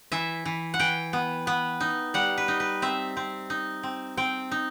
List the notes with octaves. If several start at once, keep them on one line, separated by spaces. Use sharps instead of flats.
E3 E5
E3
F#5
E3 G5
B3
B3
D#4
G3 F#5
B4
D#4
B4
C4 E5
C4
D#4
C4
C4 G5
D#4